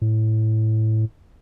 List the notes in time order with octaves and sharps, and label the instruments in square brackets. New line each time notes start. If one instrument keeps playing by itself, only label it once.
[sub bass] A2